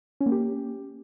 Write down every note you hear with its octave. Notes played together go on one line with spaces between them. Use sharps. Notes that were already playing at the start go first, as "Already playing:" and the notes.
C#4
A#3
G4